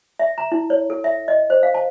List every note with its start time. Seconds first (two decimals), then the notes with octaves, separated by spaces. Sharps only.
0.19 E5
0.38 A#5
0.52 E4
0.70 C#5
0.90 A4
1.04 E5
1.28 D#5
1.50 C5
1.63 F5
1.74 A5